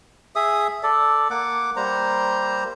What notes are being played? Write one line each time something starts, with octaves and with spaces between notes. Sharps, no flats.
G#4 E5 D#6
A4 D5
A#3 F#5 D6
G3 A#3 C5 A#5